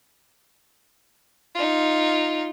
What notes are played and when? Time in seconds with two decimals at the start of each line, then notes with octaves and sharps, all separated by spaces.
1.55 D#4 F4